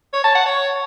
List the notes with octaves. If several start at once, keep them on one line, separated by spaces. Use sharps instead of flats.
C#5
A5
F#5
C#5